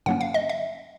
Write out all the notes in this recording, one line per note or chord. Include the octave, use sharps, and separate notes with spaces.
G2 D3 F#3 A#3 C#4 F#5
F5
D#5
E5